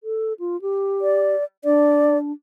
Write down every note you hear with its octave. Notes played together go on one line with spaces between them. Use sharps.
A4
F4
G4
D5
D4 D5